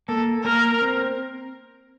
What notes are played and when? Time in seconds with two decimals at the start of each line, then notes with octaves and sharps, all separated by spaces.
0.09 A#3 A4
0.44 A#3 A#4
0.82 C4